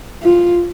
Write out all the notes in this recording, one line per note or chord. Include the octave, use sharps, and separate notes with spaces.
F4